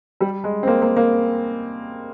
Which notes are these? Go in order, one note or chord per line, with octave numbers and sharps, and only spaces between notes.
G3
G#3
C4
A#3
A#3
A#3